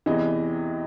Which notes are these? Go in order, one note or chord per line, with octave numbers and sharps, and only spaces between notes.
E2 C3 E3 D#5